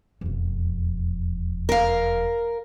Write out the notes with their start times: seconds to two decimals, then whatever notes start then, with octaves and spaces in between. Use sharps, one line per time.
0.21 E1 F2
1.69 A#4 F5